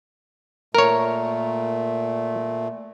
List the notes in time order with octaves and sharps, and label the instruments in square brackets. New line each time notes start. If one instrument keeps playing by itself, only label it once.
[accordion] A#2 A3 [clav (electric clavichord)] A#4 C#5